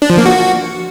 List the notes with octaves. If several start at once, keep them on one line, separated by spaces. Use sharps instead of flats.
D4
F3
A#3
F#4